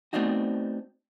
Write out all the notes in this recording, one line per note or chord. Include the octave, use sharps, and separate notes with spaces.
A3 B3 C4 D4 D#4 F#4